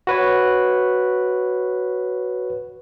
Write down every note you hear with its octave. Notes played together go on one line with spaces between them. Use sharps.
F#4 B4 C#5